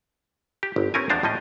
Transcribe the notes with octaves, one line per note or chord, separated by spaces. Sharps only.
G4
G1
C4 C#4 A#4 G#5
E2 F3 D4 C5 F5 A#5
A2 F3 C#4 D#5